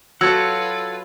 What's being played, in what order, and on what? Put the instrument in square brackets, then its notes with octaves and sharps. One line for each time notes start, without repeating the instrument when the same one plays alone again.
[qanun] F#3 [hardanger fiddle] F4 B4 [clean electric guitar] A4 F#5 [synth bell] E6 G#6